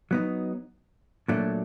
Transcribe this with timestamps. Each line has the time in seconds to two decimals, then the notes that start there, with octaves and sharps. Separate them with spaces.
0.11 F#3 B3 D#4
1.28 A#2 F#3 A3 D4